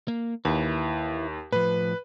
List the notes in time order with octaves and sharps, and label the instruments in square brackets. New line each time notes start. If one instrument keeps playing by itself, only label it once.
[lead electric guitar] A#3
[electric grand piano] D#2 [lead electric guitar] E4 B4
[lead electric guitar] A2 F3 [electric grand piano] B4